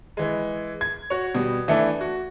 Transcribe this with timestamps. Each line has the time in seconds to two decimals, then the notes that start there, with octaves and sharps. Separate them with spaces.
0.17 E3 G#3
0.81 G#6
1.10 F#4 C#5
1.35 B2 G3
1.68 E3 A3 B3 D4 E4
2.01 F#4